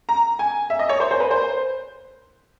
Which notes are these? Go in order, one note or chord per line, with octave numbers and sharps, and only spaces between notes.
A#5
G#5
E5
D#5
C#5
C5
C5
B4
C5